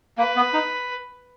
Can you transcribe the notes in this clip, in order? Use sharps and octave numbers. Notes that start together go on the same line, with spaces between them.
A#3 B4
B3
D#4